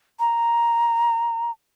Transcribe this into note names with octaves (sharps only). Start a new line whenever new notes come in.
A#5